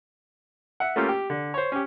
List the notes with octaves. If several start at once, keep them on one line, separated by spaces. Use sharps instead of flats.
E5 F#5
A3 A#3 C#4 F4 G4 G5
G4
D3
C5 C#5
C#4 G4